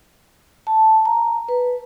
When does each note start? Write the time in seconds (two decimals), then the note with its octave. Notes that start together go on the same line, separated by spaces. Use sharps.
0.67 A5
1.05 A#5
1.48 B4